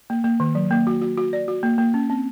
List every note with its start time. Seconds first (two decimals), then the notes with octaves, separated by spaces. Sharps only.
0.10 A#3
0.24 A#3
0.40 D#3
0.55 F#3
0.71 A#3
0.87 F#4
1.02 F#4
1.18 F#4
1.33 D5
1.48 F#4
1.63 A#3
1.78 A#3
1.94 C#4
2.10 C4